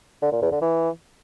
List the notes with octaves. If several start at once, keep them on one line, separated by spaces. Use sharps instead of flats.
D3
A#2
E2
D3
E3